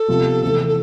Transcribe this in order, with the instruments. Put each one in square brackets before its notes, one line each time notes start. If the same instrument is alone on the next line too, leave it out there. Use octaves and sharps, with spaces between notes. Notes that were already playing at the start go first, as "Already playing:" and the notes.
Already playing: [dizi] A4
[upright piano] C3 F3 B3 F4
C3 E3 A3
[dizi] A4